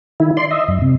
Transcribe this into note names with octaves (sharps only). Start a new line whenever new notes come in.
D#3 E4
D5 C6
D#5 E5
F#2
C3